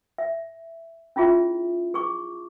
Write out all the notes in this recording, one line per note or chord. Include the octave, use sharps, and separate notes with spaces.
E5
C#4 E4 F4 G#4 E5
G#4 C#6 D6